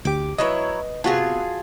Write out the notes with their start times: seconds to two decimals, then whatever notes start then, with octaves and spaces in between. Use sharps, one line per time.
0.05 D2 G4 D6
0.38 F#3 E4 B4 C#5 D#5
1.04 C3 B3 F4 F#4 G#4 A5